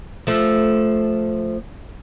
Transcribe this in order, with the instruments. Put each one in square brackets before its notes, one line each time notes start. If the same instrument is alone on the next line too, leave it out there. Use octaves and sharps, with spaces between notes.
[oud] F3 A3